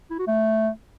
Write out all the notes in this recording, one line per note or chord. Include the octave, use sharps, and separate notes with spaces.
E4
F#4
A3